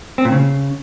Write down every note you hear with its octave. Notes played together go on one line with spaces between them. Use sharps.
C4
A#2
C#3